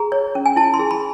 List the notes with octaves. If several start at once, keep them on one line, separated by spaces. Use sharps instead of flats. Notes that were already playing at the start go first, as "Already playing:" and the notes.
Already playing: G#4 A#5
C#5
C#4
G#5
E4 A5
C6
G#4
B5